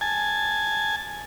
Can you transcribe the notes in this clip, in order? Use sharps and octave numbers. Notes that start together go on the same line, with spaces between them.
G#5 A5